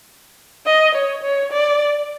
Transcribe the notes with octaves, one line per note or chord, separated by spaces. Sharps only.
D#5
C#5
C#5
D5